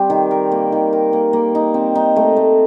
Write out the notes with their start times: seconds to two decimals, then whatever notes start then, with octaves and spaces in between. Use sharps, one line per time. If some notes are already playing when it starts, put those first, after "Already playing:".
Already playing: G3 C4 G4
0.10 D#3
0.31 A#4
0.52 A#3
0.72 D#3
0.93 A#4
1.13 A#3
1.33 A#3
1.55 D#4
1.74 C4
1.95 D#4
2.16 A3
2.37 A3